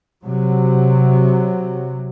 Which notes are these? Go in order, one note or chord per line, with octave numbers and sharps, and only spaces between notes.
C3 F#3